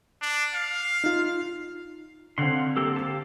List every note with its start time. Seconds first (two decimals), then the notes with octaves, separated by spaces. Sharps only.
0.22 D4
0.54 F5
1.04 D#4 F4
2.38 D3 C4 F5 F#5 C6
2.77 A#3 G4 A4
2.96 G4 F5 A5